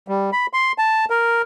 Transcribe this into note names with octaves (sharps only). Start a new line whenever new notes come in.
G3
B5
C6
A5
A#4